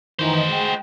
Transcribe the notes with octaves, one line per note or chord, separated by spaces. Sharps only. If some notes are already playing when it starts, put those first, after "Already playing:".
D#3 E3 D#4 F#4 C5
G#3 G5